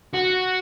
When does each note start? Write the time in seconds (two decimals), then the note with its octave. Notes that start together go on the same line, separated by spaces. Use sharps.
0.14 F#4